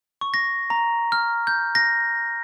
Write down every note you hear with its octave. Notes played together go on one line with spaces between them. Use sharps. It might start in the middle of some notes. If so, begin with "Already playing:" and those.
C#6
A#6
A#5
F6
G6
A#6